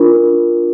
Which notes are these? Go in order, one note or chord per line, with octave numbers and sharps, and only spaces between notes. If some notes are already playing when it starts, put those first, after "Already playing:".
Already playing: D4 F4 A#4